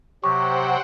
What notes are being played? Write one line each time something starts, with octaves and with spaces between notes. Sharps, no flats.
C3 F#3 G4 C5 F#5 G5 C#6